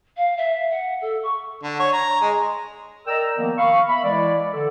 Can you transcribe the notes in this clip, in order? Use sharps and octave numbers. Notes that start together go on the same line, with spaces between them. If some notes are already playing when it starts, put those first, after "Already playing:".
F5
E5
F#5
A4
C#6
D3
C#5
A#5
G#3
A#4 D5 D#5 G5 A#5 E6
D#3 F3 A#3 B3
F5 B5 C#6
E5 B5
E3 G#3 E4 D5
D3 A4